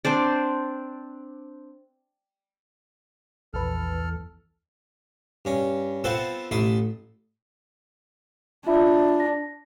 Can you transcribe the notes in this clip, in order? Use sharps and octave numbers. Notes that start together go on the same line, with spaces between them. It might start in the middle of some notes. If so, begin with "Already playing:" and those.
C4 D4 C5 D5
A#1 E2 A4 B4 F6
G2 C#4
B3 C4 F4 A4 C5 F#5
A1 A3 E4 C6 D#6
D4 F4 E5 B5
A#6